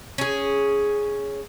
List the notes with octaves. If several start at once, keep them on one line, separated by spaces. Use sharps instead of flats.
C#4 G#4